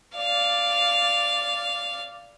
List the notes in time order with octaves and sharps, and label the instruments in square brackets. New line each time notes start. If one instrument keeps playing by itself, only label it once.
[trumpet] D5 [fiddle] F5